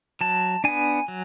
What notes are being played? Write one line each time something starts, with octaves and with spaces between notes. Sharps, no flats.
F#3 A5
B3 D4 G#5
F#3